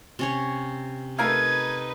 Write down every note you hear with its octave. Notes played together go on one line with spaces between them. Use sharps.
C3 C#4 C#5
A3 D#4 A#4 B4 F5 G#6